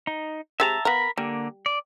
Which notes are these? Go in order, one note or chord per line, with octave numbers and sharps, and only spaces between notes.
D#4
G#3 C4 G4 E5 A5 A#5
B3 A#4 F5 A#5 B5
D3 G3 A#3
D5